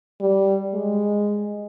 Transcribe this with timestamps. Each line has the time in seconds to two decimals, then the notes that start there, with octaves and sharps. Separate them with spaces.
0.21 G3
0.74 G#3